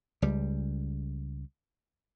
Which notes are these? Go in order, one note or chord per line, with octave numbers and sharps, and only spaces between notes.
C#2 G3